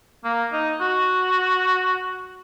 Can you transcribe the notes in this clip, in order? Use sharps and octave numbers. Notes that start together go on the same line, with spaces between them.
A#3
D#4
F#4